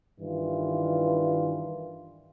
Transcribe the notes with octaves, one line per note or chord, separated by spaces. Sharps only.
G2 D#3 E3 F4